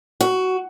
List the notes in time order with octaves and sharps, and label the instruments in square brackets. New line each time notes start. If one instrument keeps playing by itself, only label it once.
[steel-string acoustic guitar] F#4